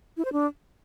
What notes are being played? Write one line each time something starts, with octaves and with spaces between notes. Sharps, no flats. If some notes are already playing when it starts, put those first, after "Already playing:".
E4
C5
D4